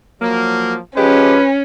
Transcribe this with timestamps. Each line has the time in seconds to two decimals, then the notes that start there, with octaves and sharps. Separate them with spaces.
0.21 F3 F#3 A#3
0.97 F3 G#3 C#4 G4 B4